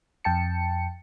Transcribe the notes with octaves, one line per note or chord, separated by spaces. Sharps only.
F2 G5 A5 C#7